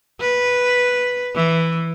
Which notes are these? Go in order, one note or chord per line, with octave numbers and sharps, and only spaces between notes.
B4
E3